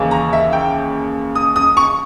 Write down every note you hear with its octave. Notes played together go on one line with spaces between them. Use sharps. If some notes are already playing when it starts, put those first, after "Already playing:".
Already playing: D#2 C#3 E3
A#5
E5
G5
D#6
D#6
C#6